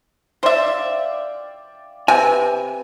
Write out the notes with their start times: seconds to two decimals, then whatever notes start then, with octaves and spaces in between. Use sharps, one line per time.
0.43 C5 D5 E5 F5 G5
2.08 C3 B4 G#5